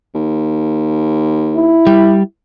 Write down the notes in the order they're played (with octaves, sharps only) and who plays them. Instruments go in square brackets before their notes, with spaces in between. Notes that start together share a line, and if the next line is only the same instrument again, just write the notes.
[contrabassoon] D#2
[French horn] E4
[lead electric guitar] G3